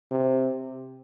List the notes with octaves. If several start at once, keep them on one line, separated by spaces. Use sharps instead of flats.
C3